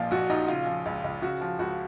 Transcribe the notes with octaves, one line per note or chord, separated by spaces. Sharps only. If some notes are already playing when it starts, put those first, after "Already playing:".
Already playing: A1 A#2 F3 F4
A#1 F#4
A#1 D#4
C#3 F4
F3
C#2
C#2
C#3 F#4
F3
C#2 F#4